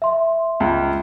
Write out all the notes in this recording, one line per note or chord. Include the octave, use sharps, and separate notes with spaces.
E5 C6
C#2